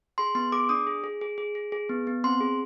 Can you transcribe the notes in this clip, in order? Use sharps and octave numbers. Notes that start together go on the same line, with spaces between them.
G#4 C6
B3 C6
G#4 D6
D4 D#6
G#4
G#4
G#4
G#4
G#4
G#4
B3
B3
C4 C6
G#4